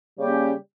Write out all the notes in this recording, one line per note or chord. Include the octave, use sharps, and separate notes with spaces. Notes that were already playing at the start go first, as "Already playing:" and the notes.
C#3 G3 A#3 C#4 G4